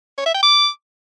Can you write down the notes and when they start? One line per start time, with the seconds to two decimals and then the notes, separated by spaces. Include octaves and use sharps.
0.18 C#5
0.26 E5
0.35 G5
0.43 D6